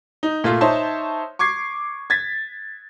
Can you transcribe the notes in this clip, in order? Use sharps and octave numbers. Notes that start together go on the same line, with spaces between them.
D#4
A#2 A3 F4
D#4 C5 C#5 E5 A5 C6
C#6 D6 G#6 C7
G#6 A6 B6